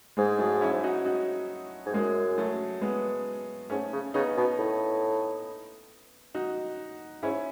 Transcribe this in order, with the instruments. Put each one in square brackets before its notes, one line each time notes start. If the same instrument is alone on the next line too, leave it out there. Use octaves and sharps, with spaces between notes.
[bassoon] G#2 [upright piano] G#3
[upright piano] F#3 A3
C#4 E4
D#4 F#4
D#4 F#4
[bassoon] G#2
[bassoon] F#2 [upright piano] G#3
[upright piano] F#3 A3
G#3 B3
[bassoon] G#2 [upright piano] A3 C#4
[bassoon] C#3
[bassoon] C#3 [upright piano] B3 D#4
[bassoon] B2
A2
[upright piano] D#4 F#4
[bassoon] G#2 [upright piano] C#4 E4